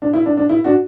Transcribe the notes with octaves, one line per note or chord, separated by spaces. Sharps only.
D4
E4
D4
D4
E4
D4 F#4